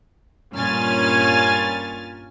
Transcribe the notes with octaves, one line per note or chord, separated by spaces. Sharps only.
G2 A#2 C#4 G#5 F6 A6